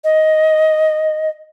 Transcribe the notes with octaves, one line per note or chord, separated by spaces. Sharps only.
D#5